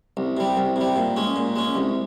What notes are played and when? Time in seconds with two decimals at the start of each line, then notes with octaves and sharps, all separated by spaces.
0.17 C2
0.37 C3 G3
0.57 C2
0.76 C3 G3
0.96 A#2
1.16 G#3 C#4
1.36 A#2
1.56 G#3 C#4
1.75 C2